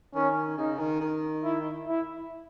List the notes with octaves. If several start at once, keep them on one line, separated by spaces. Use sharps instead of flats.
D#3 C#4
C#3 D#4
D#3
D#3
E4
E4